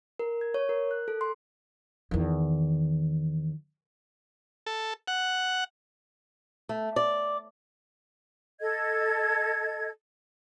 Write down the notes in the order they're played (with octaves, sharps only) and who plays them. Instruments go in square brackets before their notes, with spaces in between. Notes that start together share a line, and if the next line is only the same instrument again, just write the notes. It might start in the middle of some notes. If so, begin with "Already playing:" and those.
[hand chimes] A#4
G#6
C#5
A#4
F#6
A4
C6
[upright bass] E2 D#3
[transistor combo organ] A4
F#5
[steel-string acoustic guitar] A3
D5
[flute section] A4 D#5 G#6